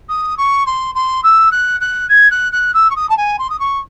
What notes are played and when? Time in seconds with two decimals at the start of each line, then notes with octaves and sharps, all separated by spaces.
0.09 D#6
0.37 C#6
0.66 C6
0.95 C6
1.23 E6
1.51 F#6
1.81 F#6
2.09 G#6
2.31 F#6
2.52 F#6
2.74 E6
2.90 C#6
2.96 D#6
3.09 A5
3.17 G#5
3.39 C6
3.50 D#6
3.59 C#6